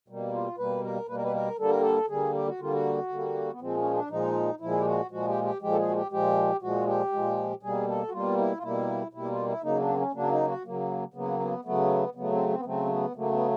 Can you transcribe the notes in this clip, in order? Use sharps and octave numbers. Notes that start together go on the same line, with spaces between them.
B2 G3 A#3
F4
B2 G3 A#3 B4
A#4
B2 G3 A#3 B4
A#4
B4
A#4
D3 G3 A#3 A4
A#4
A4
D3 G3 A#3 G#4
G4
F#4
D3 G3 A#3 F4
F#4
D3 G3 A#3
B3
A#2 F3 G#3 C4
C#4
D4
A#2 F3 G#3 D#4
A#2 F3 G#3 E4
G#4
G4
F#4
A#2 F3 G#3 F#4
G4
G4
A#2 F3 G#3 G4
A4
G#4
F#4
G4
A#2 F3 G#3 G4
A#2 F3 G#3 F#4
G4
A#2 F3 G#3
B2 G3 A#3 G#4
A4
F#4
B2 G3 A#3 F4
E4
F4
B2 G3 A#3 E4
B2 G3 A#3 E4
F4
E4
C#3 F#3 A#3 D#4
D4
C4
C#4
C#3 F#3 A#3 D4
D#4
F#4
C#3 F#3 A#3
C#3 F#3 A#3 B3
B3
C#3 F#3 A3 B3
C#3 F#3 A3 B3
C4
C4
B3
C#3 F#3 A3 C4
A#3
B3
C#3 F#3 A3 A#3
B3